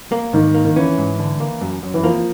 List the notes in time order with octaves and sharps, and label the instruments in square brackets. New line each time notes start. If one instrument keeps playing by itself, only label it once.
[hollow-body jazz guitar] A#3
[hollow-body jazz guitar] G#2 [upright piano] D#3
[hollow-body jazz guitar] A#3
[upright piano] D#3
[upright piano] E3 [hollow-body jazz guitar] C#4
[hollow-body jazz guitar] G#2
D3
A#3
F#2
F#2
[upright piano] E3
[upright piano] F3 [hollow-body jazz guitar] A#3